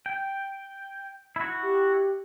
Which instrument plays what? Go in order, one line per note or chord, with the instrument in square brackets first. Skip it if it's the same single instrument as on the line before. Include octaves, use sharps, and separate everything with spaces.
[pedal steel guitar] G5
E4 F#4
[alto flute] G4